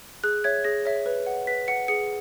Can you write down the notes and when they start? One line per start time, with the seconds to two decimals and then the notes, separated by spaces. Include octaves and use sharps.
0.24 G#4 F#6
0.44 C#5 E5 G#6
0.64 G#4 A#6
0.85 C#5 E5
1.06 B4
1.26 F#5
1.47 B4 B6
1.68 F#5 C#7
1.88 G#4 C#7